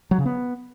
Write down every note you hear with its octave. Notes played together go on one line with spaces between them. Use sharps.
F#3
C#3
B3